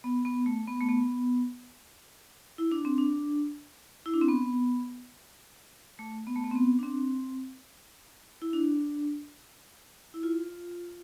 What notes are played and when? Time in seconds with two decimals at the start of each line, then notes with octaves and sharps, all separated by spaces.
0.04 B3
0.25 B3
0.46 A3
0.67 B3
0.81 A3
0.89 B3
2.58 E4
2.72 D4
2.85 C4
2.98 D4
4.06 E4
4.14 D4
4.21 C4
4.28 B3
5.99 A3
6.27 B3
6.36 A3
6.44 B3
6.51 C4
6.55 B3
6.79 D4
6.83 C4
8.42 E4
8.53 D4
10.14 E4
10.23 F4